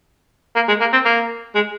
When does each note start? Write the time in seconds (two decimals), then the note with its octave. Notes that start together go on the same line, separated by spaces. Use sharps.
0.56 A#3
0.68 G#3
0.80 A#3
0.93 C4
1.05 A#3
1.55 G#3